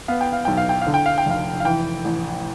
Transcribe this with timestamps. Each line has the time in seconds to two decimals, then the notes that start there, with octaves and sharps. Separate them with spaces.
0.08 B3 F5
0.21 G5
0.33 F5
0.45 B1 G5
0.57 F5
0.69 G5
0.81 F5
0.86 D3
0.94 G5
1.06 F5
1.18 G5
1.26 F1 F5
1.60 F5
1.65 E3 G5
2.05 A1